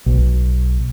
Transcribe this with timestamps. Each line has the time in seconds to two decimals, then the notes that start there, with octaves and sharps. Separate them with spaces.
0.06 B1